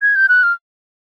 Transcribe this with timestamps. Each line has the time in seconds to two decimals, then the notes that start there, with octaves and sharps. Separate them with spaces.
0.02 G#6
0.16 G6
0.29 F#6
0.43 F6